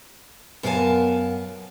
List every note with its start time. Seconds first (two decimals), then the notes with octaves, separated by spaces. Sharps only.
0.63 F#2 B3 A#4 F5 G#5 A5